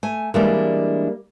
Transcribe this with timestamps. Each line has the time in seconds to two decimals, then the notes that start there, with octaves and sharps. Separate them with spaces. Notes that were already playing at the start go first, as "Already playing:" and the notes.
0.03 A3 G#5
0.34 E3 G3 G#3 A#3 D4